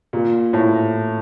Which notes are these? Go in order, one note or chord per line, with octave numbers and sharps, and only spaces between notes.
A#2
A2